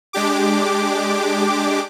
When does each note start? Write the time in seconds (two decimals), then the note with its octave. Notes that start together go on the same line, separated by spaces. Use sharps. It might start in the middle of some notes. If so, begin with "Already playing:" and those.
0.13 G#3 D4 G4 D6